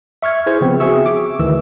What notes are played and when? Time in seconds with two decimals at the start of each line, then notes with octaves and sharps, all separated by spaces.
0.22 E5 C#6 F6 G#6
0.46 E4 G#4 C5 G#6
0.61 C#3 F3 B3 C4
0.80 F#4 G#4 E5 C#6 E6
1.06 D6
1.39 D2 D#3 E3 E6